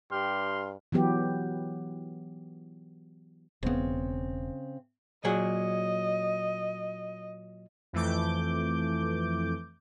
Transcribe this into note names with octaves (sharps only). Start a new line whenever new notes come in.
G2 G4 C6 F6
E3 F#3 B3 G4
E1 C#3 B3 C4
A#2 F#3 G#4 D#5
F2 E3 A3 D6 G6